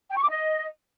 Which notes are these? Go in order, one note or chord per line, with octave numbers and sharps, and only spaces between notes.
G5
C#6
D6
D#5